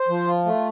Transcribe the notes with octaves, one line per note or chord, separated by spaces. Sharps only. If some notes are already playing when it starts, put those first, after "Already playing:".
Already playing: C5
F3
F4
A3